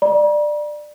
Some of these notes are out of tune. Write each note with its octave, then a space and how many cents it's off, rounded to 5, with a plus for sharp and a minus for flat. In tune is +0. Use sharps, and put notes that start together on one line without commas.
D5 +15 A#5 +45